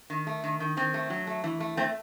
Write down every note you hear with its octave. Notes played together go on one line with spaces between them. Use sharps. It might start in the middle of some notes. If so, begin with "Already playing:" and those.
D#3
A3
D#3
D#3
D#3 C4
A3
F#3
A3
E3
A3
A3 C4